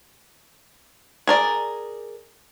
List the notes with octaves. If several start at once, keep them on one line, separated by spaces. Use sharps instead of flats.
G#4 A#4 D5